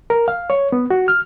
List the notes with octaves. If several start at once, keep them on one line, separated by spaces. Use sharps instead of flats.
A#4
F5
C#5
B3
F#4
F6